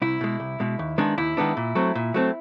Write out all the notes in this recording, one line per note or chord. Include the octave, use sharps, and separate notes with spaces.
C2 E4
B2 G#3
C2
B2 G#3
D#2
D#3 G#3 B3 D4
D#2 E4
D#3 G#3 B3 D4
A#2
F#3 A3 C4
A#2
F#3 A3 C4